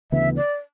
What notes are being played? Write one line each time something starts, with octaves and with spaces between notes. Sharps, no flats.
D2 C#3 E3 B3 E5
D5